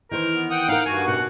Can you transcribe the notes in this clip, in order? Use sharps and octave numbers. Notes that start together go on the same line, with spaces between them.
D#3 E3 A#4 C5
B3
F#5 G5 D#6
D#4 A#4 F5
G2 F#4 G#5
B2 C4 F#5